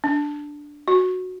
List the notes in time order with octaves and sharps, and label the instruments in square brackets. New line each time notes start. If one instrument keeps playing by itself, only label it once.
[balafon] D4
F#4